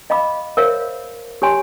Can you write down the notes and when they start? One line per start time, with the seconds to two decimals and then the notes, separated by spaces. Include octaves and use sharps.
0.10 D#5 F5 B5 D6
0.57 A#4 C5 C#5 E5 F5
1.42 G4 C#5 G#5 C6